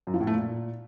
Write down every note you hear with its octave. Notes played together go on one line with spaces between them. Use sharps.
F#2
F3
A2
A3
A#2